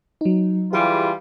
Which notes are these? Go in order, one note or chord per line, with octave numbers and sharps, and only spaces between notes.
F#3 D#4
E3 G3 F4 G4 G#4 F5